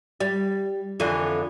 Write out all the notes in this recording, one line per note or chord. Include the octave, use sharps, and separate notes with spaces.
G3
F2 D3 E3